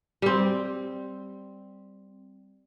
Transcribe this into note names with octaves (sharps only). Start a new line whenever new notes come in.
G3 C4